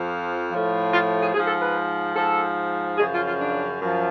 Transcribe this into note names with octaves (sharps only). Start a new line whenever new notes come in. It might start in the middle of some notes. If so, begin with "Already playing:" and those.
Already playing: F2 F3
A2 F3
F4
G#4
G#2 F3 G#4
A4
B4
G#2 F3 A4
F#2 C#3 F3 G#4
F4
F4
D4
F#2 F3